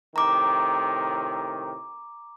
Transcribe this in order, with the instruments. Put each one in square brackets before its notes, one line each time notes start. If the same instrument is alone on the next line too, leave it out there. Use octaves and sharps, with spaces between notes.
[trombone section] A2 C3 D#3 [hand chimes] A#5 D6